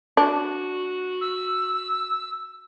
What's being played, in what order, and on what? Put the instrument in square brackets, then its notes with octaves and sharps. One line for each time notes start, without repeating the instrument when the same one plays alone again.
[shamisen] D4 [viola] F#4
[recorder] E6